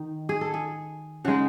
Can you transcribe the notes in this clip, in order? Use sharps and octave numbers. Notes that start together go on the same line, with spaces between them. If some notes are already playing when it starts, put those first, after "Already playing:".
Already playing: D#3 D#4
G#4
A4
G#4
C#3 G#3 D#4 F#5